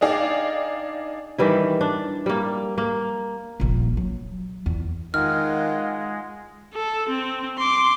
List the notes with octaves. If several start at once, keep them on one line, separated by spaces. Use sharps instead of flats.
D4 D#4 G#4 D5 F5 G5
D#3 E3 G3 E4
D4
G3 A#3
A#3
D#1 A#1
F#3
E2
D#3 G#3 F4 F#5 F6
A4
C4
C6 D6